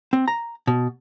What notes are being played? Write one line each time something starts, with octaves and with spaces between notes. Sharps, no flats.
C4
A#5
B2